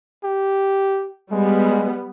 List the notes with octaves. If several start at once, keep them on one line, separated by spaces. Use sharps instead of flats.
G4
G3 G#3 B3